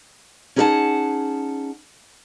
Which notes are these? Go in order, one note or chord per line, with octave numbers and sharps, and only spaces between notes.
C#4 D#4 G#4 A#4 F#5 A5